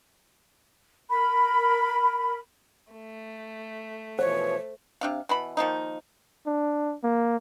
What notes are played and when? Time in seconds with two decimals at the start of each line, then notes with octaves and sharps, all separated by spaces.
1.10 A#4 B5
2.93 A3
4.19 B2 E3 F3 C5 C#5
5.01 C3 D4 F5
5.29 B2 E3 B5
5.57 D#3 F3 A#3 D#4
6.46 D4
7.03 A#3